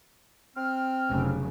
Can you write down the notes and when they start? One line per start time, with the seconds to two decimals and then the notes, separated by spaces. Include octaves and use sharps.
0.57 C4 F6
1.10 F1 C#3 F#3